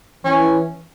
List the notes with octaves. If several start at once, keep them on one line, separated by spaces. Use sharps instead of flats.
E3 C#4